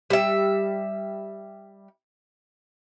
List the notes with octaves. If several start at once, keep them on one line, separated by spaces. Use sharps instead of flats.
G3 E5